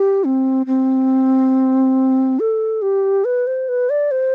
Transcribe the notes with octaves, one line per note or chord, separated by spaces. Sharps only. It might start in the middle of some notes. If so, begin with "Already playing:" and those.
Already playing: G4
C4
C4
A4
G4
B4
C5
B4
D5
C5